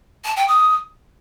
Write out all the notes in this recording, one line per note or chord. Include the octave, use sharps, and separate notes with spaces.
A5
G5
D#6